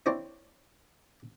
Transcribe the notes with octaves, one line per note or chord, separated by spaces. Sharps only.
C4 D4 E4 C5 C#5